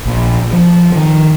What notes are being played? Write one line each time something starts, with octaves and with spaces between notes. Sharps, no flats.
A#1
F3
D#3